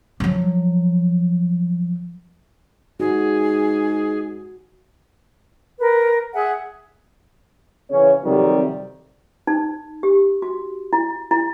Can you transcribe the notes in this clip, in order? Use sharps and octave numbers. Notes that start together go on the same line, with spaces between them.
F3 F#3
G#2 F#4 G#4
A#4 B4
G#4 E5 F#5 G#5
C#3 E3 C#4
F2 C3 D#3 F#3 G3
D#4
G4
F#4
E4
E4